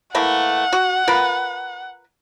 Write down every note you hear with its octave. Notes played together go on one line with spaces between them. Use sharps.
E3 A3 A#3 F#5
F#4
F4 A#4 B4